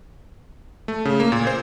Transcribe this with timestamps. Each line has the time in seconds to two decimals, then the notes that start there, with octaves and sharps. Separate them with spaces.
0.88 A3
1.05 C#3
1.20 A#3
1.32 A#2
1.47 C5